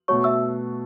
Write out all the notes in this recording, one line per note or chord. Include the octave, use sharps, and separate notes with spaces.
B2 A3 F#4 C#5 C#6
E5 E6